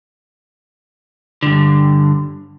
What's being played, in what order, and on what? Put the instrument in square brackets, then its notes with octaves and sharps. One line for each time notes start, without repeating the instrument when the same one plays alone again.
[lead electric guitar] G2 D3